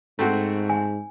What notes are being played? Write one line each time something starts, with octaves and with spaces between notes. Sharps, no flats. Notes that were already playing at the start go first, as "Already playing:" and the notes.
G#2 A3 C4 F#4
G#5